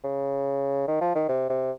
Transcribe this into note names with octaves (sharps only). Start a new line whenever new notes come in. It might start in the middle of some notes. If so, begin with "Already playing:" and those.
C#3
D#3
F3
D#3
C3
C3